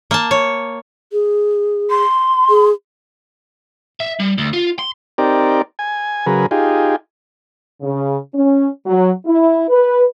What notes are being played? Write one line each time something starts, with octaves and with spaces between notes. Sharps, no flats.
A#3 A5
C#5
G#4
C6
G#4
E5
G3
D2
F4
C6
C4 D#4 G4 A#4 D5
G#5
C#3 F#3 G#4 A#4 B4
D#4 F4 G4 G#4
C#3
C#4
F#3
E4
B4